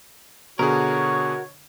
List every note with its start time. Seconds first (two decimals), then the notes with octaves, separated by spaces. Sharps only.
0.59 B2 D3 F#4 G#4 A#4 C#5